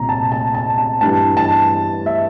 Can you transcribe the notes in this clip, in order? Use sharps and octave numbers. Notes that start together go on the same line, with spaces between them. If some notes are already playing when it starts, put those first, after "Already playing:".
Already playing: C2 A#2 A#5
A5
A5
A5
A5
G2 E3 A5
A5
E5